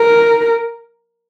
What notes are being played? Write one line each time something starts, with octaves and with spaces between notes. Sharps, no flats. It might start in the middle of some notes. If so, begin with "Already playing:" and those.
Already playing: A#4